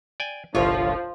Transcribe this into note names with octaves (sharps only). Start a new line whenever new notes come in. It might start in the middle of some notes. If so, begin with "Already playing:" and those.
D5 G5 G#5
G1 C2 F3 F4 C#5